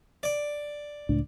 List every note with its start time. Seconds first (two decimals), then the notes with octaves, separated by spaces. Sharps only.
0.23 D5
1.09 C#2 A2 D4